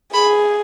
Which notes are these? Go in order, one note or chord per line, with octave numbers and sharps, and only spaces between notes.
G#4 B5